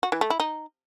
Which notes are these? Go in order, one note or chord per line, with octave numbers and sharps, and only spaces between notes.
F#4
E3
A3
E4
D#4